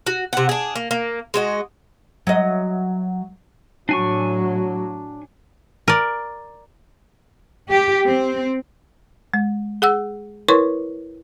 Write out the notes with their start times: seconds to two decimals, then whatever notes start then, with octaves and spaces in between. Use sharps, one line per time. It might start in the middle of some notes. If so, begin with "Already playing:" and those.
0.07 F#4
0.33 C3 F#5
0.49 D4 G#4
0.76 A#3
0.91 A#3
1.34 G#3 F#4 D#5
2.27 F#3 D#5
3.89 A2 F#3 D4 G#5 C#6
5.88 A#4 D5
7.69 G4
8.06 C4
9.34 G#3
9.82 G#4 F#5 E6
10.48 E4 A#4 B4 C#5 C6 C#6